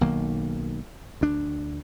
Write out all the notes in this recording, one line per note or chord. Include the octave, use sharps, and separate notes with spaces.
B1 D#3 A#3
D2 D4